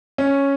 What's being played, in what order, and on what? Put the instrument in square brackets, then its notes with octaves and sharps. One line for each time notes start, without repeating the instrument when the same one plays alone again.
[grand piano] C#4